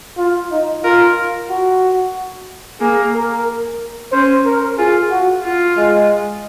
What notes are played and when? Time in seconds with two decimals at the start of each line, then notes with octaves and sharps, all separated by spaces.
0.18 F4
0.51 D#4
0.84 F4 A#4
1.50 F#4
2.81 A#3 G#4
3.14 A#4
4.12 C#4 C5
4.46 A#4
4.78 F4 G#4
5.11 F#4
5.44 F4
5.77 G#3